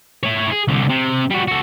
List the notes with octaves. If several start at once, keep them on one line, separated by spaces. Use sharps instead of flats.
E4 C#5
G#4
C2 D3
C3
G3 F#4
F#4 A4